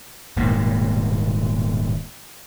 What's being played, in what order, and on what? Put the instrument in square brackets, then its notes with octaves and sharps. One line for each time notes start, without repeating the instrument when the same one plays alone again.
[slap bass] D#1 G#2 B2 A#3